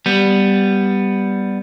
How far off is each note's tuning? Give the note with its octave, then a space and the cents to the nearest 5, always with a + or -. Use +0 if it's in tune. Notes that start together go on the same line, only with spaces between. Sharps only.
G3 +0 B3 +0